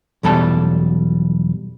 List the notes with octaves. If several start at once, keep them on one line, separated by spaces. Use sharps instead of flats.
B1 E2 G3 A4 A5